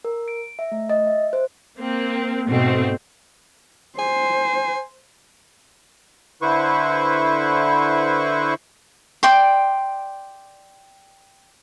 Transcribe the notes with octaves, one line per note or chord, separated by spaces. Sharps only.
A#4
D7
E5
A3
D#5
E5
C5
A#3 C4
G#2 B2 A3 C4
C5 G#5
D3 E4 B4 C5 C#6
D5 G5 C6